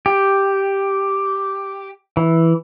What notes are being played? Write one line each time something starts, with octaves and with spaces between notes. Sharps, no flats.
G4
E3